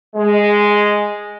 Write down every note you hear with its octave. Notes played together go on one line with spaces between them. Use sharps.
G#3